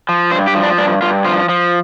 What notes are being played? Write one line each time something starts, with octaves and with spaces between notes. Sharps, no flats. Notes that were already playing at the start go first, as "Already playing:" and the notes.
F3
G2 C5
G4
F3
D4
G2 D4
G2 F4
F3 F4
F3